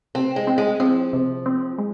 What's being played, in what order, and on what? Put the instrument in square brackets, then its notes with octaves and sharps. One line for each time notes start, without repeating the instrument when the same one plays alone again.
[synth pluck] C3 [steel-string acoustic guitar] C4
[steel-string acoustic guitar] G#3
[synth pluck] C4
[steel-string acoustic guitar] G#3
[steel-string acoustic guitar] F3 [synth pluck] C4
[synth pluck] C3
C4
G#3